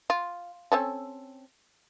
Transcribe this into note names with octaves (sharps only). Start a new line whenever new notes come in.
F4
C4 C#4 A4